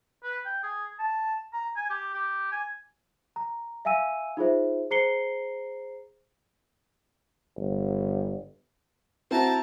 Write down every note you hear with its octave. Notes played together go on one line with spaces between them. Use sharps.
B4
G5
G#4
A5
A#5
G#5
G4
G4
G#5
A#5
E5 F5 G#5 E6 D#7
D#4 F4 G#4 C5 E5
G#4 C5 A#5 C7 C#7 G7
G1
C4 E4 F#4 A5 A#5